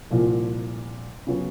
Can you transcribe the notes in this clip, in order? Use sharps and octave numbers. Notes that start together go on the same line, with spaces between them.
C2 A#2 F3
C#3 F#3 B3